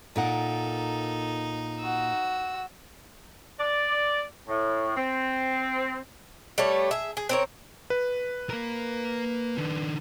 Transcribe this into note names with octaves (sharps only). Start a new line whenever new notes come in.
A#2 D#4 A4 A#4 F#5
F#4 E6
D5
A2
C4
G3 A3 B4 C#5
G#4 E5
G#4
C4 A#4 C#5
B4
A#3 A#4
D#3 D4